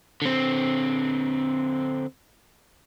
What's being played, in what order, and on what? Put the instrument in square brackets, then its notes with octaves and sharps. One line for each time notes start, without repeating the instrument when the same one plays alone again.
[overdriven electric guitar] D3 C4